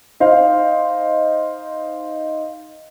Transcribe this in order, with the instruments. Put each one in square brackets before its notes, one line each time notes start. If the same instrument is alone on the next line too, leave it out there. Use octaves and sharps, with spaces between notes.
[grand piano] D#4 C5 F5